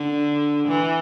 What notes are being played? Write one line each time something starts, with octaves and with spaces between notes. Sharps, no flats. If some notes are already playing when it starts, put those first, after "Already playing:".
Already playing: D3
E3